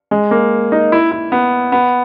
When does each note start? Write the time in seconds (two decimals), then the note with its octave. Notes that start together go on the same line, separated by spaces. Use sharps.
0.11 G#3
0.31 A#3
0.72 D#4
0.92 E4
1.12 E4
1.32 B3
1.72 B3